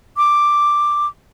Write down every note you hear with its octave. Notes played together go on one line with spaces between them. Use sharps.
D6